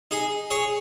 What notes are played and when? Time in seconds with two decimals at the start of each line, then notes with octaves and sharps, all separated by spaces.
0.11 D#4 G#4
0.50 G#4 C#5